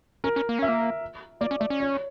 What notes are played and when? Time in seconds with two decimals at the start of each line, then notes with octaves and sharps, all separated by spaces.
0.24 C#4 A#4
0.36 C#4
0.49 A#3
0.59 C#4 E5
0.68 A#3
1.41 A#3 D5
1.51 C#4
1.60 A3 D5
1.70 C#4
1.80 C#5